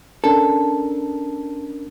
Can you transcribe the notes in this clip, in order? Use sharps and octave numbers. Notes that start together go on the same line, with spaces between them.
C#4 D4 A4 A#4